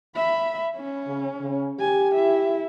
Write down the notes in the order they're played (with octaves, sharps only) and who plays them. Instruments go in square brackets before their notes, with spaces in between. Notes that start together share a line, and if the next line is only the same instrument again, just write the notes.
[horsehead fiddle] E5 B5
C#4
[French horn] C#3
C#3
[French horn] G4 [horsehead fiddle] G#5
[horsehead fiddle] E4 E5